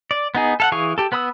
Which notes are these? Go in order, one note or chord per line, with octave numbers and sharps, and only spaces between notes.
D5
B3 D#4 G#4
A4 F5 F#5
E3 G#4 F5 C#6
G4 A4
B3 B4 B5 D#6 E6